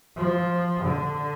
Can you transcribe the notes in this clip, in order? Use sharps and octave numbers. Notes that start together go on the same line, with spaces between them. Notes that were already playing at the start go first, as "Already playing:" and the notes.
F3
D3